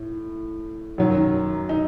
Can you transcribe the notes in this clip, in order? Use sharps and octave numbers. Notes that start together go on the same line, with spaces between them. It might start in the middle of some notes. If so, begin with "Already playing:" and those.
Already playing: A2
F#2 D#3 F#3
D#4